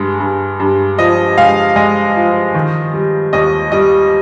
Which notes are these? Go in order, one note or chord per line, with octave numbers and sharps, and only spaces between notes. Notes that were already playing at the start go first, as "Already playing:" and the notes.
Already playing: G2 G#3
G2
G2
F3 D#5
G#3 F5
G#3 D#5
F3
D#3
G3
D#2 D#5
G3 D#5